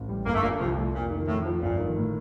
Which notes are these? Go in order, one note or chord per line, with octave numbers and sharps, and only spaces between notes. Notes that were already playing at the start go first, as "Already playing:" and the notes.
Already playing: A1
G3
G1 A#3
A3
A#2 D3 A#3
C2 F2 F3
A3
F1 A#2
D#3
F2 A2
F3
G1 A#2
D#3
A2